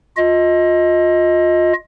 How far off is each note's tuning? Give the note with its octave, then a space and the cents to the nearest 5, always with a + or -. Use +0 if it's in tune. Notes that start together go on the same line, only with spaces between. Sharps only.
F4 +20 D#5 +15